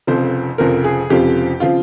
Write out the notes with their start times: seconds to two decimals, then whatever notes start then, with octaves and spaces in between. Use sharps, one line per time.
0.07 F1 F2 C#3 F3 C4 C5
0.58 F1 F2 C#3 F3 C4 A#4
0.84 G#4
1.10 F1 F2 C#3 F3 C4 G4
1.60 C#3 F3 C4 F4